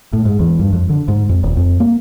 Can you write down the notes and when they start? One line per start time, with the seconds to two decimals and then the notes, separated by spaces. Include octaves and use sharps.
0.13 A2
0.26 G#2
0.40 E2
0.59 G2
0.73 F2
0.89 D3
1.08 G#2
1.29 F2
1.43 D#1
1.57 F2
1.80 A#3